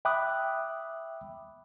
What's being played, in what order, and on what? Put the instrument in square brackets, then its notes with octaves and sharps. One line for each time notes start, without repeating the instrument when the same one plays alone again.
[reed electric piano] E5 G5 B5 D6 D#6 F#6